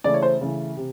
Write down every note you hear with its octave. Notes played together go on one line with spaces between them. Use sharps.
C#3 E3 A3 D5
C#5
C5
C#3 E3 A3
C3